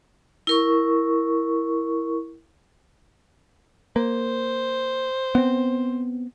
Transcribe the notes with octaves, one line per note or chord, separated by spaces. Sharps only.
E4 A#4 C#6
A#3 C5
B3 C4